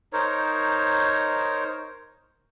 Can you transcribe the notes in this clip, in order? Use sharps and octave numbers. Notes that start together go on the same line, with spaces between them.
D#4 A#4 C5 C#5